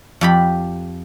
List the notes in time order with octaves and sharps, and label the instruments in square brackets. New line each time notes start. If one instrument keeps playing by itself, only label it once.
[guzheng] F2 G4 B5